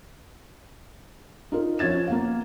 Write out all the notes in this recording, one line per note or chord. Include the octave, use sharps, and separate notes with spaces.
D#4 F4 A#4
F3 C#4 G#6 A6 E7
A#3 B3 F5